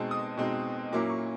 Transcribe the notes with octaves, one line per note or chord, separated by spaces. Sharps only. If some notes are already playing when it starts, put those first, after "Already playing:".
Already playing: B2 G#3 C4 D#4 A5
D#6
B2 G#3 C4 D#4
A#2 F#3 A#3 C#4 E4 D6
C#6